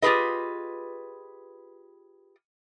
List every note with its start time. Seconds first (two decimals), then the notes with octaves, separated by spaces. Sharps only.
0.02 F4 G4 G#4 B4 D#5